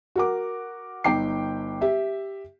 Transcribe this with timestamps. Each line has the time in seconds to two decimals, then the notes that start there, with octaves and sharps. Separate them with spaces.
0.16 F#4 A#4 D6
1.04 G1 D#4 G5 D6 C7
1.81 G4 E5